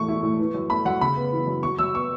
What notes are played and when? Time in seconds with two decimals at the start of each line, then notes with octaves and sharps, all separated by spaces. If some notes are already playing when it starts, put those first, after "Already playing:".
Already playing: E1 A2 A3 C#6
0.08 E4
0.23 A2
0.39 E3
0.54 F#2
0.70 A3 B5
0.85 F#2 F#5
1.01 C#3 B5
1.16 B3
1.33 E3
1.47 F#2
1.63 F#3 C#6
1.79 F#2 E6
1.94 B3 C#6